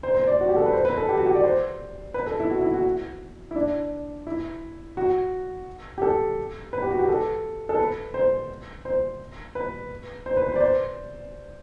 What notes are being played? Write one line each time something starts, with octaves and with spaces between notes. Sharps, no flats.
C5
C5
D5
F#4
G4
A4
B4
C5
B4
A4
G4
F#4
G4
D5
C5
B4
A4
E4
F#4
E4
F#4
E4
D4
E4
F#4
G4
A4
B4
G4
F#4
G4
A4
A4
B4
C5
C5
B4
C5
B4
C5
D5
C5